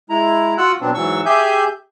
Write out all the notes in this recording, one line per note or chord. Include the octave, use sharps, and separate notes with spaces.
G#3 E4 A#5
F4 F#4 F#5 E6 F#6
B2 F#3 B3 C4 D4
G#2 E3 F#3 C#6 E6
G4 G#4 E5 G#5 G6